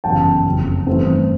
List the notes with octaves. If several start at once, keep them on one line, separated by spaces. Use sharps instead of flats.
G1 F#2 C#3 E3 G3 G5 A5
F#1 F2 C#3 F3
G2 E3 A3 C4